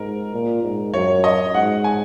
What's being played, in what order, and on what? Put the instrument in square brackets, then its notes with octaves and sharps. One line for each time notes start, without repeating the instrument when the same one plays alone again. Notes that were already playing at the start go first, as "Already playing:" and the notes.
Already playing: [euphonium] G#2 [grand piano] A#4
[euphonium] A#2
G#2
[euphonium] F#2 [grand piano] C#5
[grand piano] D#5
[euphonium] G#2 [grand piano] F#5
[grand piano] G#5